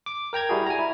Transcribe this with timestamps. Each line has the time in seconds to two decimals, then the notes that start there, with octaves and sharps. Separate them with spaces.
0.06 D6
0.33 A#4 G5 A#5 G#6
0.49 G3 E4 F#4 G#4
0.67 G#5 A#5
0.79 E4